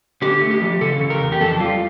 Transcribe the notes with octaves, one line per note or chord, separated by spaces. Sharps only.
D3 G4
A3
G4
F3
C#3 A4
C#3
A#4
E2
G4
F2 A4
G3 F4